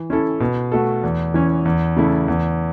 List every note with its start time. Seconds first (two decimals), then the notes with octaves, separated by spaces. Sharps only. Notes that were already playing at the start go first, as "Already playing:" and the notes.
Already playing: E3
0.10 C#4 E4 A4
0.40 B2
0.72 A3 F#4 A4
1.03 E2
1.34 E3 C#4
1.65 E2
1.97 C#3 A3 E4 A4
2.28 E2